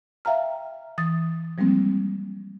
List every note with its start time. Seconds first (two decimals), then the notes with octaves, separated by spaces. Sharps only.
0.25 E5 F5 G5 A#5 F6
0.98 E3 D#6 A6
1.58 F3 G3 G#3 A#3 C4